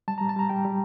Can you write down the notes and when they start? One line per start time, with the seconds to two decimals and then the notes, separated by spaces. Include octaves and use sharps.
0.08 G3 A5
0.18 G3 A#5
0.29 A5
0.36 G3 A#5
0.49 G3 G5
0.65 G3